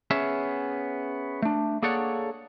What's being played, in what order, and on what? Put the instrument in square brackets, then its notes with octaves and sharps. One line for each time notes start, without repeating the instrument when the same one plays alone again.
[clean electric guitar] B3 C#4 G#4 E5
A3 D4
A#3 G#4 A4 C#5 D5 F#5